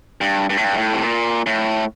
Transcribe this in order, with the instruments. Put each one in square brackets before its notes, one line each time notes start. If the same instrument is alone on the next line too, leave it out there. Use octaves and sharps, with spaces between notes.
[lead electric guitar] G2
G2
A2
G2
A2
C3
A#2
A2